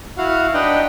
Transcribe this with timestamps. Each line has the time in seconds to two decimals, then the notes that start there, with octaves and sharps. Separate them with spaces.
0.18 E4 F#4 F5 F#5
0.54 D4 D#4 B4 D#5 F#5 G5